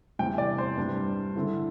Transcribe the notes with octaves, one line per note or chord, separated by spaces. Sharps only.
E2 C3 G3 C4 E4 G5
D5
C5
G2 G3 D4
D3 C4 E4